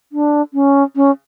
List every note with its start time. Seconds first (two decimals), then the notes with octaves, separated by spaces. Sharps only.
0.12 D4
0.54 C#4
0.96 C#4